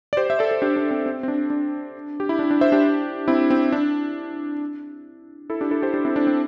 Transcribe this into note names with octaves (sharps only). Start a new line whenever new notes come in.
D5
G4 C5
E5
A4 D5
A4
D4 G4
D4
C4
C4
C4
D4
D4
G4
E4
D4
D4
C5 E5
D4 G4
C4 E4
C4
D4
E4 A4
D4 G4
E4 A4
G4 C5
D4 G4
C4 E4
D4
C4